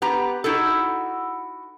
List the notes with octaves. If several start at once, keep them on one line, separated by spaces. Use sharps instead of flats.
B3 G4 A#5
D#4 E4 F#4 A4